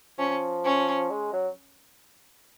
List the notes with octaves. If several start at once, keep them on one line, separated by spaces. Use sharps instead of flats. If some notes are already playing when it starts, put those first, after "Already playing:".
F3 C#4
C#4
G#3
F#3